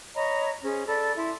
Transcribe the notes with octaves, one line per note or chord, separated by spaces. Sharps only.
C#5 D#5 A#5 B5
C#4 G#4 C5
A4 D5 B5 D6
E4 C6 D6